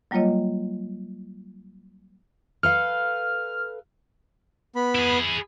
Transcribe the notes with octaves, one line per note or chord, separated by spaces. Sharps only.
F#3 G3 A#3 F4 C#5 D#5
A4 B4 F5 F6
B3 B5
E4 G#4